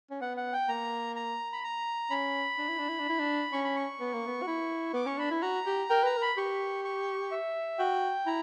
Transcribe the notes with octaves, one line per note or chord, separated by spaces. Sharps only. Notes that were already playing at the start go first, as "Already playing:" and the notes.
C#4
B3 F#5
F#5
G5
A#3 A#5
A#5
B5
A#5
C#4 B5
D4
E4
D4
E4
D4
E4
D4
C#4 C#6
B5
C#6
B3
A#3
B3
F#4
E4
B3 D6
C#4 C#6
D4 B5
E4
F#4 A#5
G4
A#4 G5
B4 A#5
A#4 B5
G4 C#6
C#6
E5
F#4 G5
E4 A#5